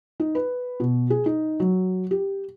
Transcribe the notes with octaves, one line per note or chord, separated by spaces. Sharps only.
D#4
B4
B2
G#4
D#4
F#3
G4